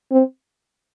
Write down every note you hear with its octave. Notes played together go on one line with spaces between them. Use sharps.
C4